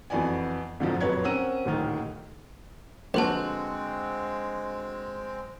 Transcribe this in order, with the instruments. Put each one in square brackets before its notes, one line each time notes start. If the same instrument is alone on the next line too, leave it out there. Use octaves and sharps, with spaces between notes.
[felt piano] F2 E3 B3 F#4 D5 G#5
F2 G#2 D3 D#3 F3 F#3
D#1 F2 F#3 B4 C#5 G#6
C4 C#4 A#4 F#5 E6 D#7
D#1 D2 A2 D#3 F6
[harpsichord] A#1 [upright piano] D3 F#4 [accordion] G#3 C4 [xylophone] A4 B4 A5